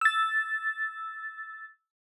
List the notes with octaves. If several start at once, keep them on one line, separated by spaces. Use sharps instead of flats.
E6 A6